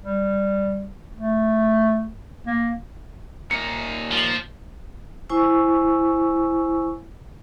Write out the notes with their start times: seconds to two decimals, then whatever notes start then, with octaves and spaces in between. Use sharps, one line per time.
0.01 G3
1.15 A3
2.47 A#3
3.51 A#2 A#3 D#4 C#7
4.12 F3
5.30 E4 C5 G#5 C#6 E6